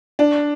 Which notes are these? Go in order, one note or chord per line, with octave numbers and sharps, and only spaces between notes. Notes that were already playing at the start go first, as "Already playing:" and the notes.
D4